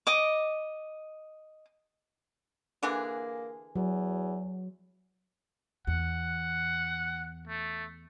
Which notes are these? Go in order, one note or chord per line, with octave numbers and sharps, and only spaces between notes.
D#5 D6
D3 E3 A#3 G#4
E2 F#3
E2 F#5
A3